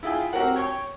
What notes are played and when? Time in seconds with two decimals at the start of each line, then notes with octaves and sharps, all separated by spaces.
0.03 E4 F4 G#4 G5
0.33 C4 F#4 G4 A#4 F#5
0.56 C#5 G5 C#6